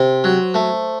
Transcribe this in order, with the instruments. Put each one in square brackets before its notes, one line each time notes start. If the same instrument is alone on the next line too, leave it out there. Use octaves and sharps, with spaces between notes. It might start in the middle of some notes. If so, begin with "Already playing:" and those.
Already playing: [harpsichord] C3 [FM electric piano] C5
[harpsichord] F#3
A3